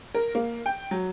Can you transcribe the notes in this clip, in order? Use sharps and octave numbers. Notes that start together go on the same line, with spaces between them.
A#4
A#3
G5
F#3